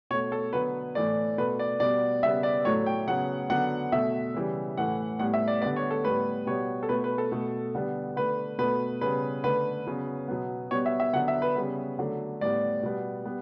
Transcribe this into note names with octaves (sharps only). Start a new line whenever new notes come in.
B2 A3 C#5
A4
D3 F#3 B3 B4
A2 E3 A3 D5
B2 A3 B4
D5
B2 G3 B3 D5
C#3 G3 B3 E5
D5
A2 F#3 A3 C#5
G5
C#3 F#3 B3 F#5
D3 F#3 B3 F#5
B2 A3 E5
C#3 E3 G3
A2 E3 A3 F#5
A2 G3 B3 F#5
E5
D5
D3 G3 B3 D5
C#5
A4
A2 G3 B3 B4
B2 G3 B3 C#5
A4
B2 A3 B4
B4
A4
B2 A3
D3 G3 B3
D3 A3 B4
B2 A3 B4
C#3 G3 B3 B4
D3 A3 B4
C#3 F#3 B3
B2 F#3 B3
B2 G3 B3 C#5
E5
E5
D3 F#3 B3 F#5
E5
B4
C#3 G3 B3
D3 F#3 A3
A2 G3 B3 D5
B2 G3 B3
G3 B3